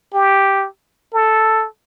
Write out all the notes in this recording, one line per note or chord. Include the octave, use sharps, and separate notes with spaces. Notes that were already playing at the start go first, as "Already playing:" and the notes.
G4
A4